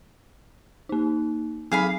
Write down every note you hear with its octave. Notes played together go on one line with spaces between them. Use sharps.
A#3 D#4
F#3 C4 G#4 F5 B5